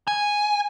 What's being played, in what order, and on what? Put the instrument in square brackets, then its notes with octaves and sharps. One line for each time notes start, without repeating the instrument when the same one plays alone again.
[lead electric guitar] G#5